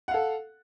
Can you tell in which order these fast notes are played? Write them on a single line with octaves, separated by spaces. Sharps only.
F#5 F5 A4